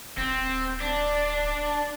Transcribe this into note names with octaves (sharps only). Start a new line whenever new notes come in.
D1 C4
D4